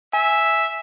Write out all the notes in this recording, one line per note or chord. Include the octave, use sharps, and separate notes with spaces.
E5 G#5